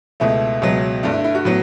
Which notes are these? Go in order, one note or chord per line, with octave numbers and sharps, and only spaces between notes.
C#2 B2 A3 E4
C#2 B2 F#3 B3
G2 D3 A3 D4
E4
E4
F#4
A2 F#3 B3 F#4